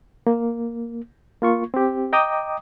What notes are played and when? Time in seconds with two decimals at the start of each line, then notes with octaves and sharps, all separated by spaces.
0.27 A#3
1.42 A#3 F4 C#6
1.74 C4 G4
2.13 D#5 G5 A#5 D6 D#6